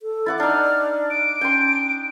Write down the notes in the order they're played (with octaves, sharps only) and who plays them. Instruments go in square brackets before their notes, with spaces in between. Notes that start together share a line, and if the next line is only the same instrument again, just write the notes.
[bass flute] A4
[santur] E4 F#5 D6 [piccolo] A6
[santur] D4 D#4 [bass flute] D5 [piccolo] F6
[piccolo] D7
[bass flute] C#4 [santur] G5 C6